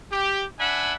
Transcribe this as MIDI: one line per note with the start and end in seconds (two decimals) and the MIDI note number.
0.12 0.45 67
0.59 0.94 62
0.59 0.94 76
0.59 0.94 78
0.59 0.94 80
0.59 0.94 83